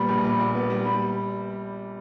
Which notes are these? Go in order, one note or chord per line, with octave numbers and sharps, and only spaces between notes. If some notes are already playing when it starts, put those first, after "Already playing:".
Already playing: A#2 G3 B3 B5
A#1
A#2
A#2
B3
G3
G3 B5